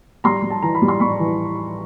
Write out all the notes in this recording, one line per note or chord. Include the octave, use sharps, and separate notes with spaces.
G3 A#5 C6
G3
A5
E3 A#5
B5
G3
C6
G3 B5 C#6
E3